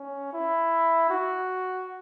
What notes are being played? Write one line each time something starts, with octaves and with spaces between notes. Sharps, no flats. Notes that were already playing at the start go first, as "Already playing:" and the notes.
Already playing: C#4
E4
F#4